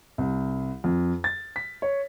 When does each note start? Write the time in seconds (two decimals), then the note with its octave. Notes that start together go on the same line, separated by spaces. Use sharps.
0.18 C2
0.84 F2
1.24 A6
1.56 B6
1.82 C#5